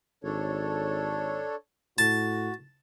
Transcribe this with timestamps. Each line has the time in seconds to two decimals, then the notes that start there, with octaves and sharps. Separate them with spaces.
0.24 G#1 D4 A4 C#5
1.98 A2 F#4 A5